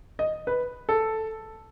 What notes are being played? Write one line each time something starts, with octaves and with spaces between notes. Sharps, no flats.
D#5
B4
A4